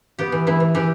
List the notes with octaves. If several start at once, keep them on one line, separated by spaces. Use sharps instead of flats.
B3 G4
E3
E3 E4
E3
E3 G4